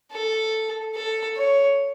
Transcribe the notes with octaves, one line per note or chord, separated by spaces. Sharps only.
A4
A4
C#5